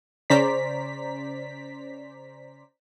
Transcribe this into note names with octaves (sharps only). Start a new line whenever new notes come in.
C#3 C#4 C5 D5 A#5 B6